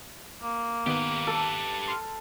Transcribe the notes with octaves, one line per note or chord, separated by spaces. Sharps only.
A#3
D#3 B3 G4 B4
A4
C6 F6